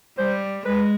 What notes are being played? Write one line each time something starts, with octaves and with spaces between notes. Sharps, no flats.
G3 C5
G#3 B4